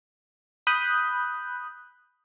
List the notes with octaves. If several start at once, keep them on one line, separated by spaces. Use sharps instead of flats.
B5 D#6 F#6 G6